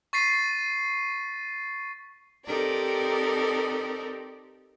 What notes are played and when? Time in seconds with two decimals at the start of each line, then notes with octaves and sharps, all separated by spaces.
0.13 C#6 A6 B6 C7 D#7
2.45 C4 D#4 G4 A4 A#4 D5